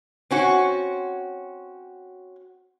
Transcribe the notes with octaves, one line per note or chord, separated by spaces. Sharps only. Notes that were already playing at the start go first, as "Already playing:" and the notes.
C4 C#4 F#4